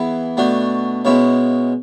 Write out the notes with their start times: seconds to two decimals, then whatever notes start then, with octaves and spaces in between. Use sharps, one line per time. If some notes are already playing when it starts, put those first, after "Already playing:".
Already playing: E3 B3 E4 G#4
0.37 B2 A3 D4 F#4
1.05 B2 G#3 C#4 E4